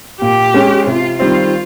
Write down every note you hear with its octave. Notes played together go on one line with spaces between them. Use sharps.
A#2 G4
G#3 C#4
C3 F4
D#3 G3 C4 F4